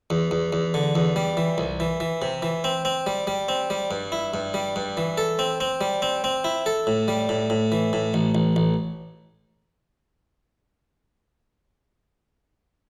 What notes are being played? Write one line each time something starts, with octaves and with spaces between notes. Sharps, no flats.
E2
E2
E2
D3
E2
G3
E3
C2
E3
E3
C3
E3
C4
C4
G3
G3
C4
G3
G2
E4
G2
G3
G2
E3
A4
C4
C4
G3
C4
C4
E4
A4
A2
G3
A2
A2
E3
A2
A1
A1
A1